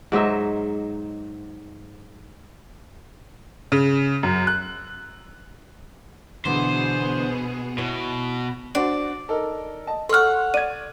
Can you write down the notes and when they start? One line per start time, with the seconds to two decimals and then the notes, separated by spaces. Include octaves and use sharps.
0.12 G#2 F#3 D#4 E5
3.72 C#3
4.23 F#2
4.47 F#6
6.45 B2 D3 E3 A3 B3 G#4 C5
7.78 B2 E4 C#5
8.75 D4 F#4 C5 D5
9.28 D#4 A4 A#4
9.87 D#5 A5
10.09 A4 C#5 F#5 C6 C#6 F6
10.54 D5 G#6 D#7